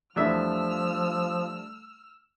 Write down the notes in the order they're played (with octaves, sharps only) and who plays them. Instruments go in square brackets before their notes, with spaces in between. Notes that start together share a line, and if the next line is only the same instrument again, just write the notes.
[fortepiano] E2 E5 [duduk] F3 [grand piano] G3 A3 D4 [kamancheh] E6 F6